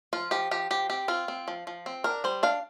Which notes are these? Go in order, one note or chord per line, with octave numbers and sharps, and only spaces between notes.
F3 F4
F3 G4
F3 G4
F3 G4
C4 G4
C4 F4
C4
F3
F3
C4
D4 A#4
G3 C5
D4 F5